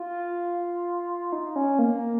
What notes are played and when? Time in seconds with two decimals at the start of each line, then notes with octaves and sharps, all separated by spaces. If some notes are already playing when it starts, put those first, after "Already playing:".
Already playing: F4
1.32 D#4
1.56 C#4
1.79 A#3